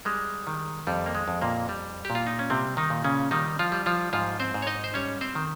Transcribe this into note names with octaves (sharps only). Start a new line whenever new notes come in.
G3 G#3
D#3
F2 G3
A#3
G#3
F2
A#2 A#3
G3
A#2 G4
F4
D#4
C#4
C3 G3 C4
D#3 D#4
A#2
C#3 C#4
D#3 G3 D#4
F3 F4
G3
F3 F4
G#2 F3 F4
C4 C5
G#2
C#5
D#4 D#5
C5
G3 C#4 C#5
C4 C5
D#3